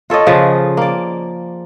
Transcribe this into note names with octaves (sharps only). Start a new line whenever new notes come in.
F4 A4 C#5 D#5
C#3 F3 G#4 B4
A#3 D5